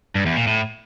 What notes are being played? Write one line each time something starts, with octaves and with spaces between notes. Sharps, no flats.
G2
E2
A#2
A2